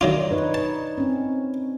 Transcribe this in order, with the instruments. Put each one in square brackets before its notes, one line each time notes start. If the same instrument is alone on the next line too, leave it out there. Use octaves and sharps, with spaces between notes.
[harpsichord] D#3 F#3 F4 [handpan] D4
[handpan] D#4 B4 C#5
[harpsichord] A5
[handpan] C4 C#4